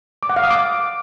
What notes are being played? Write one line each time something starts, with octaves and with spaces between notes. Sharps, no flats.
D6
F#5
F5
D#6
D6